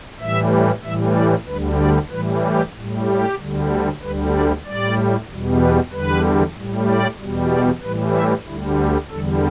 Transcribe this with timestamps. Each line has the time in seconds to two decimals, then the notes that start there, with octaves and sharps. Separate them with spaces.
0.20 A2 E3 G3 E5
0.84 A2 E3 G3 E5
1.15 D5
1.47 D2 D3 G3 B4
1.79 D5
2.11 A2 E3 G3 B4
2.43 G4
2.74 A2 G3
3.06 G4
3.38 D2 D3 G3
4.02 D2 D3 G3 B4
4.33 D5
4.65 A2 G3 D5
5.28 E2 B2 G3
5.60 B4
5.92 E2 D3 G3 B4
6.56 A2 G3
6.88 D5
7.19 E2 B2 G3
7.50 D5
7.82 A2 E3 G3 B4
8.14 E5
8.47 D2 D3 G3 E4
8.78 G4
9.10 E2 D3 G3 A4